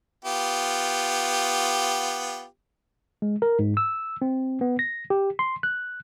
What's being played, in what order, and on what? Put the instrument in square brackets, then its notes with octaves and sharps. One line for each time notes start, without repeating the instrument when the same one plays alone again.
[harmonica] B3 F4 G4
[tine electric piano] G#3
A#4
G#2
E6
C4
B3
A#6
G4
C6
F#6